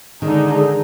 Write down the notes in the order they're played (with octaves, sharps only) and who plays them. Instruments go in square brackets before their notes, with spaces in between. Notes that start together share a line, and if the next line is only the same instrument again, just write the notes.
[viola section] D3 G#3 D#4 G#4 [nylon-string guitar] D#3